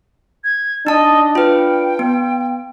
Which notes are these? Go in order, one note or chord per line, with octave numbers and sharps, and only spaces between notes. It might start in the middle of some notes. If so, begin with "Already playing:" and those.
G#6
D4 D#4 D#5 A5
F4 B4 G5
B3